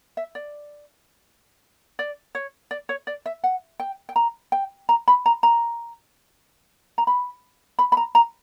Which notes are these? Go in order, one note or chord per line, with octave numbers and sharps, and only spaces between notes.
E5
D5
D5
C#5
D5
C#5
D5
E5
F#5
G5
G5
A#5
G5
A#5
B5
A#5
A#5
A#5
B5
B5
B5
A#5
A#5